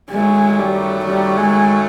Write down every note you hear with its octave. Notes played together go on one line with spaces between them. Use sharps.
F#2 D#3 F#3 G#3 A3
G3
G3
G#3